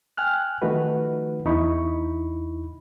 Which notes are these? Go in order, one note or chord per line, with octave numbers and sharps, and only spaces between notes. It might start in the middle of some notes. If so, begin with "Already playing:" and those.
G5 G#5 F6 F#6
D#3 F3 A3 D#4 F#4 B4
E2 D#4 E4 B5 C#6